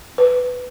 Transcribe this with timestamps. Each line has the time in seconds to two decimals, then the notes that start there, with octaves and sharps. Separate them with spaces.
0.18 B4